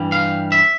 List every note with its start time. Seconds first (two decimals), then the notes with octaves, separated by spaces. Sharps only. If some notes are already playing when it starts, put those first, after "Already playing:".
Already playing: G2 E3 G3
0.12 F5
0.52 E5